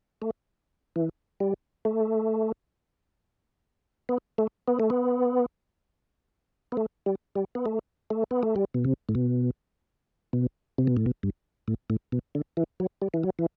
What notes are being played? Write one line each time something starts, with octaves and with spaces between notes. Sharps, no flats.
A3
E3
G3
A3
B3
A3
B3
A3
B3
B3
A3
G3
G3
B3
A3
A3
B3
A3
G3
B2
C3
A2
B2
B2
C3
B2
A2
B2
G2
A2
A2
B2
D3
E3
F#3
G3
E3
F#3
E3